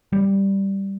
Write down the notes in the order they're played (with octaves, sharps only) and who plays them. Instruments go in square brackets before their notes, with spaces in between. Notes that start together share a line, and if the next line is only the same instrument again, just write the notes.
[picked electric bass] G3